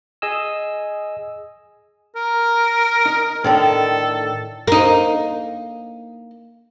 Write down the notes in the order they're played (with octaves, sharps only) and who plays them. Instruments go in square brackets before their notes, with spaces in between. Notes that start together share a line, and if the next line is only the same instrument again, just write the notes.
[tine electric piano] G#4 D#5 G#5 E6
[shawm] A#4
[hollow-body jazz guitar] D#4
[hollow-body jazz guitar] A2 D3 D#3 [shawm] A4
[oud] A#3 D#4